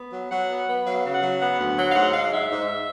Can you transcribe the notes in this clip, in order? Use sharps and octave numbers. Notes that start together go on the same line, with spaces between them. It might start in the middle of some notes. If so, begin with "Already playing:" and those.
Already playing: B3
F#3
F#3 F#5
B3
B3
F#3 F5
C#3
F#5
F#3
B3 F#5
D2
F#3
F5
G#2 F#5
G#3 F5
G#2 E5
G#2